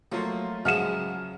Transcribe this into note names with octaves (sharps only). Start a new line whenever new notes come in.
F3 F#3 A3 A#3 F4 C#5
C#3 F3 F#3 G#3 E5 F#5 F6 E7